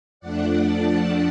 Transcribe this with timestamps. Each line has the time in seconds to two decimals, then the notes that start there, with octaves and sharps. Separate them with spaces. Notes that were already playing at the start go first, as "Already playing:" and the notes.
0.20 F2 F3 A3 D4 D5 F#5
0.66 F#5 A5